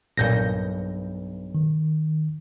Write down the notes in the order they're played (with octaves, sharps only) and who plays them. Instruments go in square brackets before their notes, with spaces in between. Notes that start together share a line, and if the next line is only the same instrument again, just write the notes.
[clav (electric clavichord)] B1 G2 [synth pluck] A#2 G6 A#6
[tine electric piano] D#3